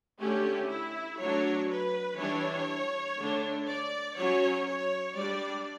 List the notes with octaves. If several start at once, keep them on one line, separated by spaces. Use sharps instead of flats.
D3 A3 C#4 G4
E4
F#3 A3 D4 C#5
B4
E3 G3 D4 C#5
D3 A3 D4
D5
F#3 C#4 C#5
C#5
G3 D4 D5